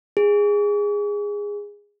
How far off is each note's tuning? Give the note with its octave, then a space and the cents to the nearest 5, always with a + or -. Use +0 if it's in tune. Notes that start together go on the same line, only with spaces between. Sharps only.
G#4 -15